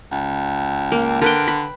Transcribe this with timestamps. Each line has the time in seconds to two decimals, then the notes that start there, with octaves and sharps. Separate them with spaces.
0.12 C#2
0.92 A#3
1.22 D3 A#4 B4 G5
1.48 B5